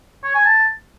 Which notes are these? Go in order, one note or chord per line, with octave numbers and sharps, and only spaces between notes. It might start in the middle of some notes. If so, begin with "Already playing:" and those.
C#5
G#5
A5